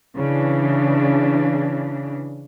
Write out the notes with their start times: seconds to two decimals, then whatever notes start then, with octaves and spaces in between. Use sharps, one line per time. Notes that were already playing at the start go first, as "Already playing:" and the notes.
0.16 C#3 E3 D4